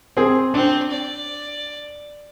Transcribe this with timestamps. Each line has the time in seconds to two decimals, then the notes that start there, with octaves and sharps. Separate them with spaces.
0.17 C4 G#4
0.54 C4 D4
0.91 D5